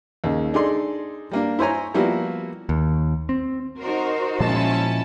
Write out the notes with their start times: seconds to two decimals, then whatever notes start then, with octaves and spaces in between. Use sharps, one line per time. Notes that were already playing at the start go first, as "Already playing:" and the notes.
0.24 D#2 C#3
0.54 D4 D#4 G#4 A4 D5 C6
1.31 G3 A#3 D4
1.59 E4 C5 C#5 G#5 A#5
1.94 F3 G3 A#3 B3 E4 F#4
2.69 D#2
3.29 C4
3.79 D#4 F#4 A#4 C5
4.40 A#2 F3 G#3 C#4 E4 A5